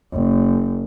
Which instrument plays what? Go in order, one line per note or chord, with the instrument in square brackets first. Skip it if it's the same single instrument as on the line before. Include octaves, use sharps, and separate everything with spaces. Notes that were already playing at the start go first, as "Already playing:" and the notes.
[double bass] F#1